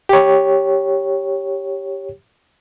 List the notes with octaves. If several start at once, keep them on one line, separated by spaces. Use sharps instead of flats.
G4 C#5